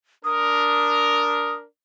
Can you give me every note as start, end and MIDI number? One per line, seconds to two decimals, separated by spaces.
0.24 1.65 62
0.24 1.65 70
0.24 1.54 87